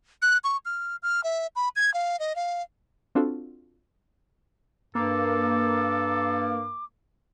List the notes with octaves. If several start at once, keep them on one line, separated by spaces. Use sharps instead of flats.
F#6
C#6
F6
F6
E5
B5
G#6
F5
D#5
F5
C4 D4 F4 F#4 A4
G2 A#3 A4 D6